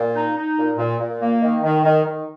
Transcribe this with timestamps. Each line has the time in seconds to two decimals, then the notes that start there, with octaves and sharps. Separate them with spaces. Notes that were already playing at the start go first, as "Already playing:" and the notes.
Already playing: A#2
0.15 D#4
0.36 D#4
0.58 A#2
0.78 A#2
0.99 A#2
1.20 A#3
1.41 D#3
1.62 D#3
1.83 D#3
2.04 D#3